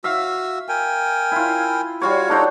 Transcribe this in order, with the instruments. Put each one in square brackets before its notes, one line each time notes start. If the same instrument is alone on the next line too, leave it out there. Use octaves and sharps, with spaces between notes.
[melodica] F#4 E6 [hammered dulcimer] E5 F5
[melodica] A#4 G5 G#5
[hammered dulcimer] E4 F4
[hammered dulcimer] G3 F4 C#5 [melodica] F#4
[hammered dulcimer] D4 F#4 C5 [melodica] D#4 A4